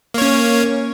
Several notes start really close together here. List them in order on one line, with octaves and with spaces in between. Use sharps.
A#3 C#5 C#4